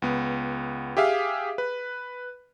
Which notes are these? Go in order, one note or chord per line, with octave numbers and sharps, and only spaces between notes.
C#2 B3
G4 G#4 E5 F5
B4